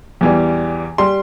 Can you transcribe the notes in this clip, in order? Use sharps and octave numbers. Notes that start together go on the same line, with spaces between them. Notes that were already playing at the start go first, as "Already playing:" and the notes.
E2 E3 G3
G3 C6